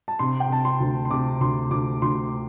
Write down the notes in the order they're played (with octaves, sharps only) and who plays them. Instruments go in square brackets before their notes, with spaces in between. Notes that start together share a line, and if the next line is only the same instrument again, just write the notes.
[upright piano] A5
C3 C6
G5
C3 A5
C6
D2
C6
C3 D6
D2 C6
D2 D6
D2 C6